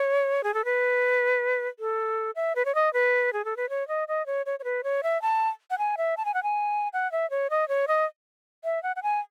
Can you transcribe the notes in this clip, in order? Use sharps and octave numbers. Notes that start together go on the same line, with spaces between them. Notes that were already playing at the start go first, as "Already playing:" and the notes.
Already playing: C#5
G#4
A4
B4
A4
E5
B4
C#5
D#5
B4
G#4
A4
B4
C#5
D#5
D#5
C#5
C#5
C#5
B4
C#5
E5
A5
F#5
G#5
E5
A5
G#5
F#5
G#5
F#5
E5
C#5
D#5
C#5
D#5
E5
F#5
F#5
G#5